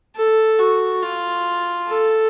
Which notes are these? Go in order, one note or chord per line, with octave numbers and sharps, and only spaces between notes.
A4
F#4
F4
A4